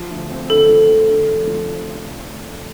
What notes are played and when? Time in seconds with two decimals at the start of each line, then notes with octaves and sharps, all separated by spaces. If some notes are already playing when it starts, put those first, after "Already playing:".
Already playing: F3
0.11 D2
0.30 C4
0.50 D3 A4
0.69 F3
0.89 D2
1.08 D3
1.28 F1
1.47 F3